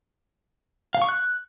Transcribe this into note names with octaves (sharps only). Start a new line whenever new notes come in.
F5
C#6
F#6